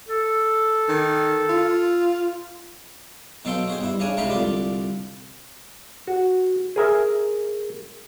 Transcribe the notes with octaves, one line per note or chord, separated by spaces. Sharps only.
A4
D#3
F4
B2 F#3 A4 F5 G5 C6
F#4 G#4 C5
G2 E4
C#3 C#4 D4 G#5
C#2 C3 C4 D#4 F5 B5
C2 D3 F4 D5
F#4
G#4 A#4 E5